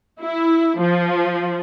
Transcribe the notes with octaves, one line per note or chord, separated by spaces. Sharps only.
E4
F3